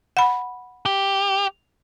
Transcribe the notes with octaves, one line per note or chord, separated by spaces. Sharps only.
F#5 B5
G4